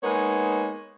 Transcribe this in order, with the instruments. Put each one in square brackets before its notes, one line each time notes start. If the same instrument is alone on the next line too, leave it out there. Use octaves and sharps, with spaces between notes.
[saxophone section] G#3 A#3 B3 D#4 C#5